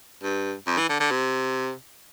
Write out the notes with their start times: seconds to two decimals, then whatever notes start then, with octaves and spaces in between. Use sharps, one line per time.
0.23 G2
0.67 F2
0.78 E3
0.89 D3
1.00 D3
1.11 C3